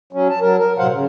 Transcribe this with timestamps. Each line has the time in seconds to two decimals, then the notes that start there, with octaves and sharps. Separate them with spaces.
0.13 F#3 C#4
0.29 A5
0.41 F#3 A#4
0.58 A#4
0.78 A2 C3 F#3 C5 F5 F#5
0.90 C#3